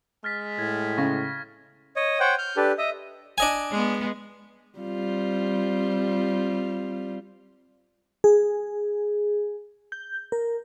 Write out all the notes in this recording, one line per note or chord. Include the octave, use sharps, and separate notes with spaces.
G#3 F6 A6 B6
A2 G#6
C#3 C#6 A#6
C#5 D#5
C5 C#5 F#5 G5
F6 G6
D4 G4 A4 B4
D#5 E5
D4 D#5 G#5
G#3 B3
G3 C4 F4
G#4
G6
A#4